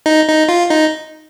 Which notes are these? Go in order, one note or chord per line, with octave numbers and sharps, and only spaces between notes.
D#4
D#4
F4
D#4